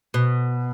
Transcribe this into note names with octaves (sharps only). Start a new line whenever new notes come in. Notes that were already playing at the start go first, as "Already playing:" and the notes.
B2